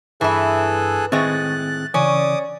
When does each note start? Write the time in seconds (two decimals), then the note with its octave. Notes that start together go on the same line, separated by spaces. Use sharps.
0.21 G2 E3 E4 G#4 A4 F#6
1.12 A2 D#3 G#3 C4 F#6 A6
1.94 C#3 E3 C#4 D5 D6 D#6